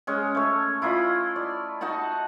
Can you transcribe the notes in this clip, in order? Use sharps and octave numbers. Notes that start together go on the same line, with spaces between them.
G#3 C#4
A3 C#5
E4 F4 D#5 B5
D5
D#4 F#4 F#5 A5